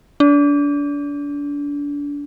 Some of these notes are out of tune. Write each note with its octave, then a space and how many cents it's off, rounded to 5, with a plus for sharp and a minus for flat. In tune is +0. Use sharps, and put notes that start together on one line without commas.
D4 -30